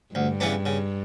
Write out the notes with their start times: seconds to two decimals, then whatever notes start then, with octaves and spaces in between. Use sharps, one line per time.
0.14 D2 G2
0.40 C#3 E3 B3 D4
0.66 C#3